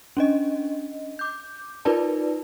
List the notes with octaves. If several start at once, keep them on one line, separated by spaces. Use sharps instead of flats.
C#4 D4 D#5
D6 G6
D#4 F4 A#4 B4 D5 A5